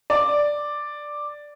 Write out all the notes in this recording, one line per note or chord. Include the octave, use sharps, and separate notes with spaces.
D5